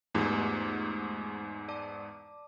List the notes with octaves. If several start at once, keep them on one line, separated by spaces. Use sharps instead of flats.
E2 G#2 A3 F4 G4
D5 A5 D6